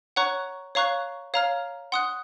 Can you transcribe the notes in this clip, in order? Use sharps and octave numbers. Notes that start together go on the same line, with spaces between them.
C#5 F#5 A#5 C#6 F#6
C#5 F5 A#5 C#6 F#6
C#5 F5 A#5 F6
F#5 C6 D#6 F#6